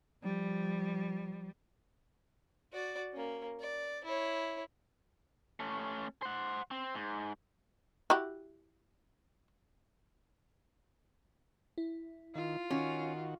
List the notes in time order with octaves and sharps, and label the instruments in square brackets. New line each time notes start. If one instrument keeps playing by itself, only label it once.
[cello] F3 G3
[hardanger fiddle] F#4 D5
A#3 C#4
D5
E4 C#5
[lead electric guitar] A3 C#4
C5 F#5
C4
G#2
[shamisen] E4 F#4 G4
[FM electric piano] E4
[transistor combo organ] D#3 [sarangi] F4
[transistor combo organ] D#3 F#4 [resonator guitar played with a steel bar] C#4